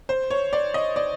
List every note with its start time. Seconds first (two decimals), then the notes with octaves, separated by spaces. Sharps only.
0.09 C5
0.30 C#5
0.53 D5
0.74 D#5
0.96 D5